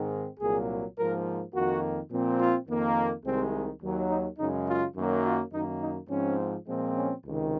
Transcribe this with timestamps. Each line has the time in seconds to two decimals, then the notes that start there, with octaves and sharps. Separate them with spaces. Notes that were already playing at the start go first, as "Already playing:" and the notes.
Already playing: G#2 D#3 G#3 C4
0.39 C2 A#2 F#3 A#3 G#4
0.97 G#2 F3 A#3 A#4
1.53 F2 D#3 A#3 F#4
2.10 A#2 F3 C4
2.39 F4
2.67 F2 D#3 A#3
3.24 C2 C3 D#3 G#3 C4
3.81 D#2 D#3 F#3
4.10 D#4
4.38 F#2 C#3 G#3 D#4
4.67 F4
4.95 F#2 D#3 F#3 A#3
5.24 F4
5.52 F#2 D#3 A#3 D#4
5.81 D#4
6.09 G#2 F3 C4 C#4
6.66 A#2 F3 G#3 C4
6.94 C#4
7.24 C#2 C3 D#3